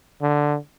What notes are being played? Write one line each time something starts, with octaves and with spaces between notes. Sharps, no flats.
D3